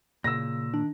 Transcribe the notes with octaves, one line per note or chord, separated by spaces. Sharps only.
A#2 C#3 E6 A#6
D#3 D4